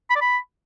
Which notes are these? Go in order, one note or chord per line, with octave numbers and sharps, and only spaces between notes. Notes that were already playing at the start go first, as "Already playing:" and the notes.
B5
D5
B5